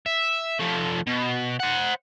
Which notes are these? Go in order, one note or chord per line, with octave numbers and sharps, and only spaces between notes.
E5
F3 A3
B2
C5 F#5